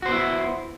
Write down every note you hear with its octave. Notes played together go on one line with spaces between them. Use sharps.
B3 E4 F#4 C5